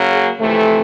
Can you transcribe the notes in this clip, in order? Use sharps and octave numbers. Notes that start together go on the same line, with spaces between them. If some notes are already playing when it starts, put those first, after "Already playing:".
Already playing: C#3 F#3 A#3
G#4
F2 C3 E3 A3